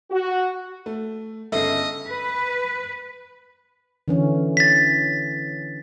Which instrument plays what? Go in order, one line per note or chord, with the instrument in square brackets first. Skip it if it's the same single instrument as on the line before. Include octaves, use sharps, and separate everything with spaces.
[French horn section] F#4
[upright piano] A3
[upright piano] G1 C#3 [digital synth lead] A4 [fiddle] D#5 [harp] E5 C7
[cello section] B4
[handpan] D3 E3 C#4
[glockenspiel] A6 B6